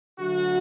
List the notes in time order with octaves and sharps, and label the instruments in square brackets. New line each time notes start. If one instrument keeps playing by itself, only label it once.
[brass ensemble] D3 F#3 A3 E4 F#4